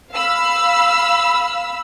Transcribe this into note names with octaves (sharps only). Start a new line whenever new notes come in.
F5 B5 E6